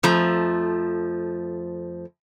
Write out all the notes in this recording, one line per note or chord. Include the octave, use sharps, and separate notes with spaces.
F2 F3 A3 A#5